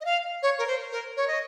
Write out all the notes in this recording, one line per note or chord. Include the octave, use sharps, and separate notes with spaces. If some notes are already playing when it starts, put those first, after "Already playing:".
D#5
F5
C#5
A#4
C5
A#4
C#5
D#5